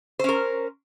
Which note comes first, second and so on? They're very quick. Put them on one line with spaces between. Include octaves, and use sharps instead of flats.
C5 C#4 A#4